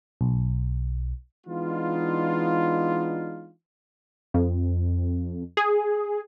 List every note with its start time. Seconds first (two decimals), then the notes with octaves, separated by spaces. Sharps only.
0.21 B1
1.47 E3 G#3 B3 D4 D#4 F4
4.34 F2
5.57 G#4